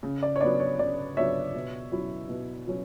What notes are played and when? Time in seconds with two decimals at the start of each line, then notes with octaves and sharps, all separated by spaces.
0.03 C#3
0.23 D5
0.36 C#5
0.41 F#3 B3 D4 D5
0.60 C#5
0.79 C#3 D5
1.17 F#3 B3 D4 C#5 E5
1.55 B2
1.92 F#3 C#4 E4
2.29 B2
2.67 F#3 C#4